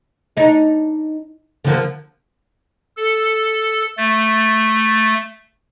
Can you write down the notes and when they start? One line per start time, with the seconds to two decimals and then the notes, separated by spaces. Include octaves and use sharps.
0.37 D4 D#4
1.65 D3 F3 A#3
2.97 A4
3.98 A3 A6